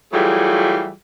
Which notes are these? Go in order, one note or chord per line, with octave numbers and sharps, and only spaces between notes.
E3 F#3 G3 A3 F4 G#4